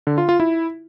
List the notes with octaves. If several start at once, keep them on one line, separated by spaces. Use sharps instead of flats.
D3
F4
F4
E4